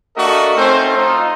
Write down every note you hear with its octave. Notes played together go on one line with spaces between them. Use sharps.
A3 D4 F#4 A#4 D#5 F5
A3 C4 C#4 D#4 C5
D#4 F4